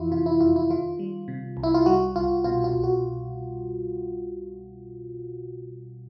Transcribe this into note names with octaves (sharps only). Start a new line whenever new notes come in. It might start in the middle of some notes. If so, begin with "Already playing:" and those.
Already playing: F2 E3 E4 F4
C3 F4
E4
F2 F4
E4
D#3 F4
G3
C3
C2
E4
F4
G3 F#4
C2 F4
B2 F4
F4
C2
F#4